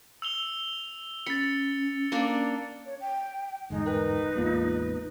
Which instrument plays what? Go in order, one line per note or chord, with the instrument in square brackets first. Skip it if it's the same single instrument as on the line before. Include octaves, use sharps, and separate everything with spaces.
[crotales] E6 F7 G7
[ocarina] C#4 [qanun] B5 [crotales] A6 C#7
[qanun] A#3 D4 D5
[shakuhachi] C#5
G5
[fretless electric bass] G1 E2 G#2 [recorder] G#3 [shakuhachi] D#4
[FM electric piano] A#4 G5 F#6 [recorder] B4
[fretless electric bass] A1 E2 G#3 [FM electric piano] A#3 B3 F4